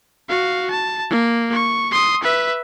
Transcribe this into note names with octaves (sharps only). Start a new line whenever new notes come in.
F#4 F5
A5
A#3
C#6
C6 D#6
B4 E5